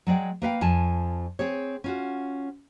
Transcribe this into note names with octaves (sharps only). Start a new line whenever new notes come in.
F#3 G#3 D5 G5
A#3 B4 F5 G5
F2 F4 G#5 A5
C4 G#4 C#5
C#4 F4 F#4